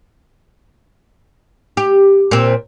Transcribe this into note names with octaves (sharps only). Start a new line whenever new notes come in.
G4
A#2 C4